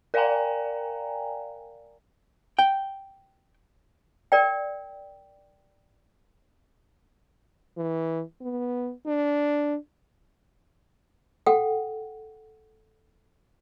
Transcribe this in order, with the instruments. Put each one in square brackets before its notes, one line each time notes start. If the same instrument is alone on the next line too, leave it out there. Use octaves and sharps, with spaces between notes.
[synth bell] A#4 D5 F5 G5 G#5 A#5
[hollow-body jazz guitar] G5
[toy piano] A#4 D5 G5
[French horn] E3
B3
D4
[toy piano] A4 F#5 G5